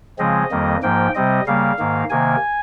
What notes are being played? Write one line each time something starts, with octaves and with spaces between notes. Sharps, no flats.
C#3 F3 G#3 C4 D#5
F2 D#3 G3 A#3
G#2 F3 A#3 G5
C3 G3 C4 D#5
C#3 G3 A#3 F5
G#2 D#3 A#3
C3 D#3 A#3 G#5